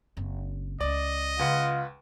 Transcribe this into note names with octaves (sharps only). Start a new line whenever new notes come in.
F#1 C4
C#2 C#4 D5 D#5
C#2 C#3 F4 B4 F#5